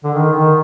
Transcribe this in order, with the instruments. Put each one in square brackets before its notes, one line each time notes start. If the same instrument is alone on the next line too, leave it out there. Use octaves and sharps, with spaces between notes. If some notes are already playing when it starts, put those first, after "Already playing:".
[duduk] D3
D#3
D#3